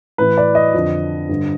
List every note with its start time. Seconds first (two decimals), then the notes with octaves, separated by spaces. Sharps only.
0.18 A2 E3 B4
0.38 D5
0.55 D#5
0.74 F2 D3
1.29 G2 D3